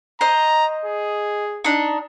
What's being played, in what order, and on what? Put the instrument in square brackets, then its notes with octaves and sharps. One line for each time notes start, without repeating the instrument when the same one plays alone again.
[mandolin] C5 D#5 [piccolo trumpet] A#5
[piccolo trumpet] G#4
[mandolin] D4 D#4